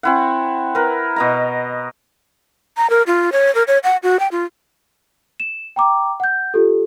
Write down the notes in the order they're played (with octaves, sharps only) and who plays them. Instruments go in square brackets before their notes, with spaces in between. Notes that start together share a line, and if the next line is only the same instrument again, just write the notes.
[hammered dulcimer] C4 E4 F#5
A#4 B4
B2 D#5 A#5
[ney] A#5
A#4
F4
C#5
A#4
C#5
F#5
F#4
G5
F4
[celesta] E7
G5 A#5 D6
F#5 G6
F4 G4 A4